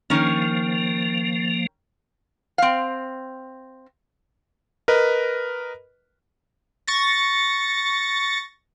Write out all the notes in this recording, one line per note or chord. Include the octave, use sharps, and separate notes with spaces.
D#3 F3 A#3 C#4
C4 F5
A#4 B4 D#5
C#6 A6 A#6